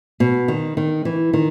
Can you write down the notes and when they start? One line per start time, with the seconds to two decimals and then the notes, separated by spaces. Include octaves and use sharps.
0.20 B2
0.48 D#3
0.77 D#3
1.05 E3
1.33 D#3